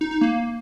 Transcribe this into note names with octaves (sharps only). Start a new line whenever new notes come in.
D#4
D#4
A#3